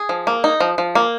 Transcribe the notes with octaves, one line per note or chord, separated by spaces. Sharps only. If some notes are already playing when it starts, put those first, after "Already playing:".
Already playing: G#4
F3
A#3
D#4
F3
F3
A#3